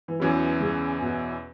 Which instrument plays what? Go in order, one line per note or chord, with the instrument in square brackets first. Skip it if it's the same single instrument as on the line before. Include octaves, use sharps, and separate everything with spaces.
[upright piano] E3
[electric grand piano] E2 E3 C#4 E4 [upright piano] F#3
[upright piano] C#3
B2